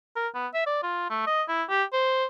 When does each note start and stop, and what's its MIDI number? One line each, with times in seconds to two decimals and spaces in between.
0.16 0.28 70
0.35 0.47 59
0.54 0.63 76
0.67 0.82 74
0.83 1.10 65
1.10 1.24 57
1.27 1.43 75
1.49 1.63 64
1.69 1.84 67
1.93 2.25 72